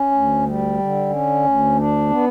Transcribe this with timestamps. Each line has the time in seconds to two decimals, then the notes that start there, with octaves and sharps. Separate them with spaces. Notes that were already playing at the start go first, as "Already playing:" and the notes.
Already playing: C#4
0.11 D2
0.44 G3
0.78 D3
1.10 C#4
1.44 D2
1.76 D4
2.10 B3